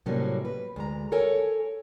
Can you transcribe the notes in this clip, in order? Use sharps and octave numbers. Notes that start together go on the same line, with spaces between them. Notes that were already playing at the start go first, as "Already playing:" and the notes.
A2 C3 F#3 G3 A#3 C#4
B4
D2 G#3 A#5
A4 A#4 C#5 G#5